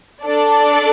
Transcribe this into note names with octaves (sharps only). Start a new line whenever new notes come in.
D4 A4 D5